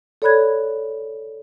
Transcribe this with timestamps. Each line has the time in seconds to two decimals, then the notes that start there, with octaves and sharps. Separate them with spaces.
0.22 A4 C#5 D5 B5 F#6 G#6